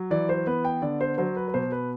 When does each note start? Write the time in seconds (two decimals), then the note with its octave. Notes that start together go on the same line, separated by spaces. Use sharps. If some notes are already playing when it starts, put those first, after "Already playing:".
Already playing: F#3
0.11 E3 D5
0.29 C5
0.47 B3 B4
0.65 G5
0.82 D3 D5
1.01 C5
1.18 F#3 C5
1.36 B4
1.48 B4
1.54 B2 C5
1.72 B4